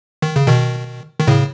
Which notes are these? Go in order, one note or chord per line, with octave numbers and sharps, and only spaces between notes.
D#3
C#3
B2 D#3
D#3
A2 C#3